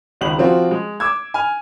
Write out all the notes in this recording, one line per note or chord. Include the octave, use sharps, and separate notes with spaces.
G#1 C#2 F#7
F3 C4 F4 F#4
G#3
D6 E6 G#6
G#5 F6